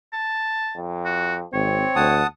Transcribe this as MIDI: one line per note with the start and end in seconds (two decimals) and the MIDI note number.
0.13 0.75 81
0.76 1.44 41
1.06 1.35 66
1.53 1.84 32
1.53 2.13 60
1.53 2.17 73
1.96 2.22 38
1.96 2.27 78
1.96 2.27 81
1.96 2.27 87